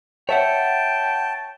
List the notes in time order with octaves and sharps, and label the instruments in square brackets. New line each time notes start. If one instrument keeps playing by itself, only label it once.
[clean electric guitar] C#5 E5 F#5 [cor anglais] G5 [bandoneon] A5